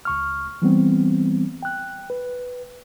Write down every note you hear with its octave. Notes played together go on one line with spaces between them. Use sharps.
C#2 C#6 F6
E3 G3 B3 C4
G5 F#6
B4